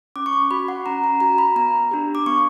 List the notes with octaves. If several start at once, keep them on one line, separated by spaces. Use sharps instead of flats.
C#4 D6
C#6
D6
F#4 B5
F#5
C#4 A#5
A#5
F#4 A#5
B5
B3 A#5
D4 G4
D6
B3 C#6